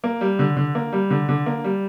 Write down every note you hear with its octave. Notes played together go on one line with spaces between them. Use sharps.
A#3
G3
D3
D3
A#3
G3
D3
D3
A#3
G3